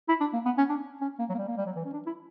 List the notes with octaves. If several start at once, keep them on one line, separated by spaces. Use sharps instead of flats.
E4
D4
A#3
B3
C#4
D4
C#4
A#3
F#3
A#3
G3
A#3
G3
F#3
E3
C#4
D4
E4